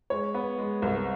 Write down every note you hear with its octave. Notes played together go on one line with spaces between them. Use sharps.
G#3 C#5
B3
G#3
C2